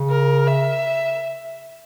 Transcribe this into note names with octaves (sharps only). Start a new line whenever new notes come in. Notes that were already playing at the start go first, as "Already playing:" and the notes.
Already playing: C#3
A#4
E5